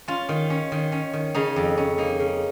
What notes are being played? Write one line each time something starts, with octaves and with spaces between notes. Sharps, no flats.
C#4 F4
D#3
C#4
D#3
C#4
D#3
C#3 D#4 G#4
F2
C#4
A#3 D#4
C#3